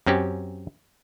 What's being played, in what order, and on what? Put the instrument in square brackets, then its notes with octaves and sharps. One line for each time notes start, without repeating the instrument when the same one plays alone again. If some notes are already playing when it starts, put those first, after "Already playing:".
[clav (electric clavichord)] F#2 C4 C#4 G4